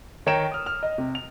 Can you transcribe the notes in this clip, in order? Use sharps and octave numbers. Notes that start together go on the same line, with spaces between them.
D#3 C#5 G5 A#5 D7 E7
D#6 F6
F6
D#5
C3
F7